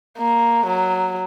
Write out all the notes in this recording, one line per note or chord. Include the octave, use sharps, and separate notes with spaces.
A#3
F#3